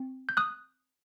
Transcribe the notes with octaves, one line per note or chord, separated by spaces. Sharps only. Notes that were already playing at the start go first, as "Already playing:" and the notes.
Already playing: C4
G6
D#6 F#6